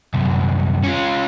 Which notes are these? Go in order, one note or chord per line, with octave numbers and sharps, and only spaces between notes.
C2 F#2
C#4 F4